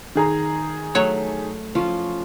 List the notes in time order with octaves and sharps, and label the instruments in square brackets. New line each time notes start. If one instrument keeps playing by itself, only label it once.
[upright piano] D#3 G#4 A#5
[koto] F#3 C#5 [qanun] A3
[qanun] F3 C#4 F4